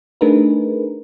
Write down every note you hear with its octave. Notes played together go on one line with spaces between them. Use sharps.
A3 D4 D#4 G#4 A#4 B4